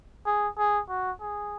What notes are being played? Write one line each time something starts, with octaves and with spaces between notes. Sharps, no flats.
G#4
G#4
F#4
G#4